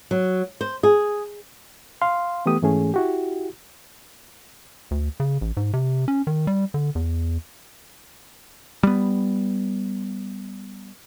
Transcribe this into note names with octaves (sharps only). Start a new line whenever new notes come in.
F#3
C5
G#4
F5 C6
E3 A3 B3 G4 D#6
G#2 E3 A3 C#4 G#4
E4 F#4 G4
D2
C#3
A1
G#2
C3
C#4
D#3
G3
D3
E2
G3 B3